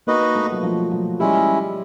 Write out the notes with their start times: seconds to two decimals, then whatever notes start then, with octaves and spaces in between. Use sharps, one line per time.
0.07 A#3 D#4 F#4 B4 D#5
0.35 A3
0.52 F#3
0.63 F3
0.91 F#3
1.20 G3 G#3 C#4 E4